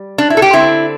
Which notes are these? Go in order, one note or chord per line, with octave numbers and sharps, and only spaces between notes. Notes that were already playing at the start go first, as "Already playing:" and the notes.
Already playing: G3
D4
E4
A4
G4
D3 C4 E4